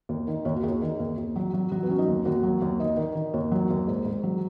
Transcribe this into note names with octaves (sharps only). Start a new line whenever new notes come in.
D#2
D#3
D#2 C#5
F#4
D#2 G#4
D#3
D#2
D#2
F#3
F#3
F#3 F#4
B3
F#3 C#4
D#4
D#2
D#2 F#4
F#3
D#2
D#3 D#5
D#3
D#3
D#2 C#5
F#3
D#2
G#2
G#2
F#3